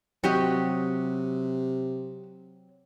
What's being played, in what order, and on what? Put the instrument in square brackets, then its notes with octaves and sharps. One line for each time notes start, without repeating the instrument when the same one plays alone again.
[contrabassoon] C3 [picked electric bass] F#3 C4 [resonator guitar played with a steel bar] F#4 G4 D#5